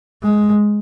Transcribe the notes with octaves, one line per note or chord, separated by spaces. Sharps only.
G#3